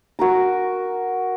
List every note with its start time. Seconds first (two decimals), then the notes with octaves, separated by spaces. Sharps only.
0.19 F#4 A#4 A#5